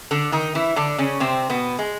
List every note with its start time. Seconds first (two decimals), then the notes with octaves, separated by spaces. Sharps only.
0.11 D3 D4
0.32 D#3 D#4
0.55 E3 E4
0.76 D3 D4
0.98 C#3 C#4
1.20 C3 C4
1.50 B2 B3
1.79 G#3